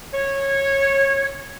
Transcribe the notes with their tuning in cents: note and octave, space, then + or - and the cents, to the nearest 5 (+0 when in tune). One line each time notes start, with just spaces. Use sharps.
C#5 -15